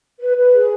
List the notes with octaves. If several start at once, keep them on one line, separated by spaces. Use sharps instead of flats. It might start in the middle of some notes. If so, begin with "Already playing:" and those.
B4
B4
G#4